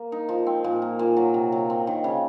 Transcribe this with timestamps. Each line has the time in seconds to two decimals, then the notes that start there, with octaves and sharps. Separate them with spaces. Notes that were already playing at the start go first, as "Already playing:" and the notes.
Already playing: A#3
0.12 D#4
0.29 F3
0.47 C4
0.64 A#2
0.82 A#3
0.99 A#2
1.17 F#3
1.34 C3
1.52 F#3
1.70 C4
1.87 D#3
2.04 C#3